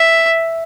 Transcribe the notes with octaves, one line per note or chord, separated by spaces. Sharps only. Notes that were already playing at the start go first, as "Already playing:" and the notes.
Already playing: E5